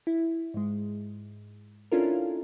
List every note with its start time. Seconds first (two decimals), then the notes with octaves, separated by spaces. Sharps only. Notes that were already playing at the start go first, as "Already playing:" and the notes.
0.07 E4
0.54 G#2 G#3
1.92 C#4 D4 E4 F4 A4 A#4